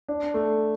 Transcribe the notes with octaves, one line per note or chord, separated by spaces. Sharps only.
D4
A3